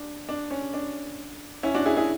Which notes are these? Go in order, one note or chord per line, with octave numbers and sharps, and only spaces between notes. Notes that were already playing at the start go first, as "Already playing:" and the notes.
Already playing: D4
D4
C#4
D4
C#4 E4
D4 F#4
E4 G#4
E4 G#4